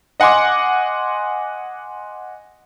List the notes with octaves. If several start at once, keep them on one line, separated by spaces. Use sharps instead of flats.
D#5 F#5 G#5 C6 D6